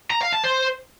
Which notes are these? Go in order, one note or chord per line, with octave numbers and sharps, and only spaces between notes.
A#5
F5
A5
C5